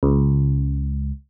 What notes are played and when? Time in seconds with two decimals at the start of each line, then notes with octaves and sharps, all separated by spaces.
0.03 C#2